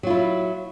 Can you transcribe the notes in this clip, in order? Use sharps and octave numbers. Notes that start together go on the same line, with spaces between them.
F#3 E4 F4